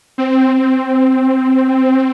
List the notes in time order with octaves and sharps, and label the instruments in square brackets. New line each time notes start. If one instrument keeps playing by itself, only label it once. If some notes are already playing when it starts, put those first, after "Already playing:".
[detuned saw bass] C4